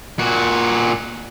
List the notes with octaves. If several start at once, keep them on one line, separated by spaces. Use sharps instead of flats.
A#2 F#4